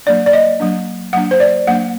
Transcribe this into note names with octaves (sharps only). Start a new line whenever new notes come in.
F#3 A#3 D4 D5
D5
D#5
F#3 A#3 D4
F#3 A#3 D4 F#5
C5
D5
F#3 A#3 D4 F#5